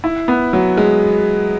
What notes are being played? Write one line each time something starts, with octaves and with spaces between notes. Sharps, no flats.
E4
B3
F#3
G#3